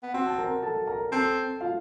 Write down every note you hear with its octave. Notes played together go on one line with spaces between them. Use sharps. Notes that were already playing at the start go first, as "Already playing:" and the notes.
B3
C4 F#4 F#5
A5
A#4 A#5
A4 A5
A#4 A#5
C4 A4 A5
F4 F5